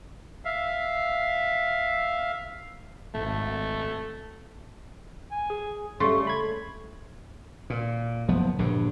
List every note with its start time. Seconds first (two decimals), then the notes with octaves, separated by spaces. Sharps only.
0.45 E5 F5
3.14 G#1 A3
5.31 G#5
5.50 G#4
6.00 C#3 G3 A3 C#5 C6 C#6
6.27 B5 G#6
7.70 A#2
8.28 F#1 F3 B3
8.58 A#1 G2 D3